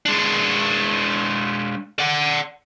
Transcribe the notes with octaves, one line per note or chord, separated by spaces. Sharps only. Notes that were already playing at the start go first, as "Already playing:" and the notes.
G#3 D4
D5 F#5